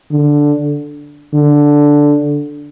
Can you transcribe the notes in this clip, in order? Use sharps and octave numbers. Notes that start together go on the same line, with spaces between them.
D3
D3